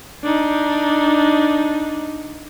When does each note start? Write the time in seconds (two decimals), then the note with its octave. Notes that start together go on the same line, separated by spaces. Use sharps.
0.23 D4 D#4